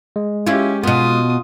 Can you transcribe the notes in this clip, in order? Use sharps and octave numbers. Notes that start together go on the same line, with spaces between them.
G#3
C#4 E4 F4 G4
B2 B3 F4 D#6